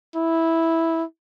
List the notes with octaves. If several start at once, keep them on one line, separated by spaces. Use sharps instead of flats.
E4